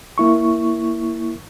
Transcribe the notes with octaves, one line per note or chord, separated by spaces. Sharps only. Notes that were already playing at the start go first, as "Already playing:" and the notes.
A#3 E4 C#6